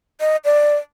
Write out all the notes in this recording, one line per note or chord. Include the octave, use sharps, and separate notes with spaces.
D#5
D5